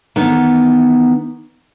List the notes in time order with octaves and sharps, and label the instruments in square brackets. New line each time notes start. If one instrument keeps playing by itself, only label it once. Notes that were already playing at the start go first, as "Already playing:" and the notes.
[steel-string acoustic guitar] D#3 E3 B3